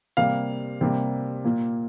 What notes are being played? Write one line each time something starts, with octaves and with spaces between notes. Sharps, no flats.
C3 G3 A#3 F5
C3 G3 A#3
A#2 A#3